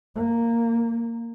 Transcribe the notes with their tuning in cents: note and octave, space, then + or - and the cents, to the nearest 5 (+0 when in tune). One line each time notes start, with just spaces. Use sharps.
A#3 -10